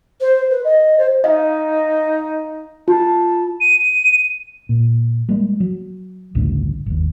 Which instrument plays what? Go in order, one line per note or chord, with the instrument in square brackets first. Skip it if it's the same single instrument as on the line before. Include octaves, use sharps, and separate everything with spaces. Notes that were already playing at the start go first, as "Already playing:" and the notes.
[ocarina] C5
B4
D#5
C5
[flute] D#4 [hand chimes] D#5 F5
[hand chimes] F4 [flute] A5
[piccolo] D#7
[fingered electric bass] A#2
G3 G#3 A#3
F#3
A1 D2 G2 C#3
G1 D#2